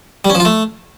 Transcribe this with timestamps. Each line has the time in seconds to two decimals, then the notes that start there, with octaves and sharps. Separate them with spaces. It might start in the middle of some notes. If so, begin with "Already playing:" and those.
0.25 G3
0.30 C#4
0.35 F3
0.40 F4
0.45 A3